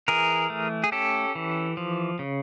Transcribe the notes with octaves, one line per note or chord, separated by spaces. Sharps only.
E3 G#4 A#4
A3
G#4
C#4 G4 A4
E3
F3
C#3